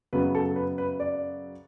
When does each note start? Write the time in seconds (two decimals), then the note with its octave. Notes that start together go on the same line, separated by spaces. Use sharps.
0.13 F#2 C#3 F#3 B3 B4
0.35 A4
0.56 B4
0.78 B4
1.00 D5